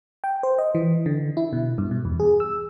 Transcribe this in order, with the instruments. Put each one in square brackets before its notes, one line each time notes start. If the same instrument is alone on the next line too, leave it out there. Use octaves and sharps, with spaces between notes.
[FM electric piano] G5
C5
D#5
E3
D3
E4
B2
G2
B2
E2
G#4
E6